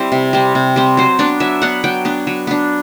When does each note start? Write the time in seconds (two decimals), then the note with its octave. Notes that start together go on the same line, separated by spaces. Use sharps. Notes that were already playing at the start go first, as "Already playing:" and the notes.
Already playing: G3 C4 E4
0.12 C3
0.33 G3 C4
0.55 C3
0.76 G3 C4
0.97 F#3 C5
1.19 B3 D4 D5
1.40 F#3 E5
1.62 B3 D4 F#5
1.84 F#3 G5
2.05 B3 D4
2.27 F#3
2.47 B3 D4